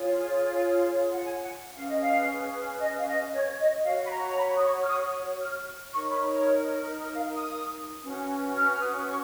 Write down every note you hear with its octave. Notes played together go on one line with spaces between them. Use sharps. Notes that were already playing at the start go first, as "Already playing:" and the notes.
Already playing: F4 G#4 C#5
F#5
G#5
F#5
C#4 G#4 B4 F5
D#5
F5
D#5
F5
D#5
C#5
D#5
F#4 C#5 F5
B5
A#5
A#5
B5
D#6
C#6
F6
D#6
F6
D#4 A#4 C#5 C#6
B5
C#5
D#5
F5
D#6
C#4 F#4 B4
F6
F6
D#6
C#6